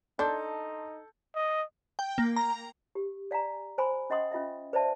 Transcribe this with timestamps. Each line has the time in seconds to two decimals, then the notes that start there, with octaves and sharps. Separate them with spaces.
0.19 D4 D#4 A4 A5 C6 G6
1.35 D#5
1.99 G5
2.18 A#3
2.36 A#5
2.95 G4
3.31 D5 F5 G#5 A#5
3.78 C5 G#5 B5 C6
4.10 C#4 D#5 F#5 C6 D#6
4.31 C#4 F4 D#5 E5
4.73 B4 C5 D5 E5 A5